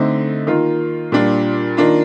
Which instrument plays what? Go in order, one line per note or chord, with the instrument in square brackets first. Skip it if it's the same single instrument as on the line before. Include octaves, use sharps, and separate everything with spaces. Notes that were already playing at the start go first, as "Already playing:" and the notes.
Already playing: [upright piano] D3 A3 C4 D#4
D#3 A#3 F4
A#2 G3 D4 F4
D#3 A#3 D4 F4